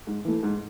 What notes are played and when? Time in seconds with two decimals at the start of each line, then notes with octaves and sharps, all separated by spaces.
0.07 G#2
0.25 E3 A3
0.43 G#2